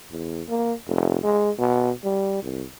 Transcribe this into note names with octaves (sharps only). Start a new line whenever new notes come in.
E2
A#3
F1
G#3
B2
G3
C2